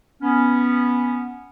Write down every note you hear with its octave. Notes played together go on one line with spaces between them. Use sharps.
B3 C#4